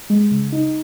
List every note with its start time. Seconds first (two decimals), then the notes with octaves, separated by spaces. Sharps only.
0.10 G#3
0.31 C#3
0.52 D#4